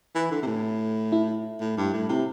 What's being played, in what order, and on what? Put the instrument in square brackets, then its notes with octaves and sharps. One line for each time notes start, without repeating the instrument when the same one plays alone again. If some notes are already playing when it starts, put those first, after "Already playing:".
[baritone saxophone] E3
D3
C3
A2
[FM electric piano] E4
[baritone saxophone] A2
G2
A2
[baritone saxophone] C3 [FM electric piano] E4